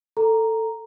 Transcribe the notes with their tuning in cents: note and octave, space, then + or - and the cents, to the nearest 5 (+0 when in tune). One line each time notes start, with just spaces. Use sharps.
A4 +15 A#5 +0